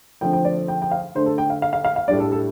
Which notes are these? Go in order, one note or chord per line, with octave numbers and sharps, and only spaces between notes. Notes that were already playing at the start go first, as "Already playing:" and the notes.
D3 F3 A3 C4 G5
G5
D5
G5
G5
F5
D3 A3 D4 C5
A4
G5
F5
F5
F5
F5
F5
A2 G3 D4 D5
A4
A4